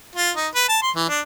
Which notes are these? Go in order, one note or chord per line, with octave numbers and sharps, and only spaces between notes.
F4
D#4
B4
A5
C6
E3
D4